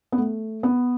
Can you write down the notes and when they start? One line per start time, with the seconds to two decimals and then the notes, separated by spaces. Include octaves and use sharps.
0.12 B3
0.18 A3
0.63 B3